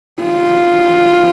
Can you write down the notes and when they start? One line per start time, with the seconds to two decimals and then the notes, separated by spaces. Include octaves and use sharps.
0.23 F4